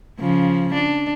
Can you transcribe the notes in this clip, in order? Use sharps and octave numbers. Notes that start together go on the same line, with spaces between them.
C#3 F3
D4